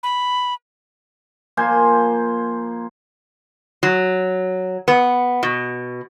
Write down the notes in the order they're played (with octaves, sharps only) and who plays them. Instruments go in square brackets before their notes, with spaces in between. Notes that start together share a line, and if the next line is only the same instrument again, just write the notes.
[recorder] B5
[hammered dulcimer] F3 A#3 C5 G#5
[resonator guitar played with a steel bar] F#3
B3
B2